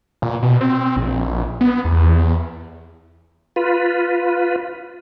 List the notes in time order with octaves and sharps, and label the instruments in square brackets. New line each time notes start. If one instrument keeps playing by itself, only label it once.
[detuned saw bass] A#2
B2
C4
A#1
B3
E2
[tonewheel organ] F4 B4